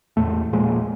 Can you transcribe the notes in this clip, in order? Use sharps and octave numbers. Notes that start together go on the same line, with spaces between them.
E2 A2 A3
A#2 F3 G#3 A#3